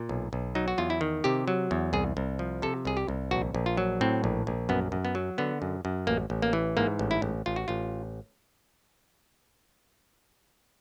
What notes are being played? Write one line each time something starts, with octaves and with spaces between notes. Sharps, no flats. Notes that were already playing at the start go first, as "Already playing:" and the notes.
Already playing: A#2
B1
B1
F#3 D#4
F#4
E2 F4
E4
D#3
C3 G4
F#3
E2
C2 G#4
C2
F3
C3 A4
C2 G#4
G4
C2
A#1 F#4
A#1
F4
F#3
A2 C4
A#1
A#1
F#2 B3
F#2
B3
F#3
D3 B3
F#2
F#2
A1 A#3
A1
A#3
E3
G#2 A#3
A1
E4
A1
A1 F4
F#4
A1 F4